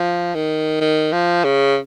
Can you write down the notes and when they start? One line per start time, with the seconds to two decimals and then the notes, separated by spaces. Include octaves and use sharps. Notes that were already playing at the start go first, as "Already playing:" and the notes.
Already playing: F3
0.35 D#3
0.81 D#3
1.12 F3
1.44 C#3